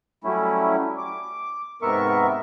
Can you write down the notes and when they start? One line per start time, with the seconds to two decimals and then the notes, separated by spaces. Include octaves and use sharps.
0.24 F#3 G3 A3 C#4 E4
0.98 D6
1.82 G#2 C3 B3 A#4 E5 C#6